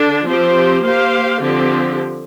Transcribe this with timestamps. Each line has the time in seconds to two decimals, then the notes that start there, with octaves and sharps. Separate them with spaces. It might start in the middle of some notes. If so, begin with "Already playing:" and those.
Already playing: D3 D4
0.25 F3 C4 G4 C5
0.83 A#3 G4 C5 F5
1.40 D3 F3 C4 G4